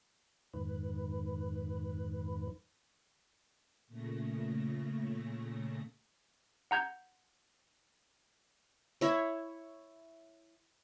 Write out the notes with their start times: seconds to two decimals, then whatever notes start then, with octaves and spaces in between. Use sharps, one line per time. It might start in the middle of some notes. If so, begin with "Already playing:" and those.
0.54 F2 G#2 D#3 B4
3.87 A#2 C#3 A3 A#6
6.71 F#5 A#5 G6 G#6
9.01 E4 C#5